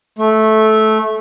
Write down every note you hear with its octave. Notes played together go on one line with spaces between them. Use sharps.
A3